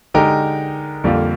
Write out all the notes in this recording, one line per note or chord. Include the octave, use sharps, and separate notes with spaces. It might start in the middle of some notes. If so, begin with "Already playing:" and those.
D3 G#3 D#4 G4 A#4
F2 D3 G3 A#3 F4